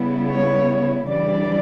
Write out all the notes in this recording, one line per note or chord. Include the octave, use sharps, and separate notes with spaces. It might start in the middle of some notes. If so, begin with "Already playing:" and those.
Already playing: C#3 G3 B3 E4
C#5
C#3 E3 G3 D4 D5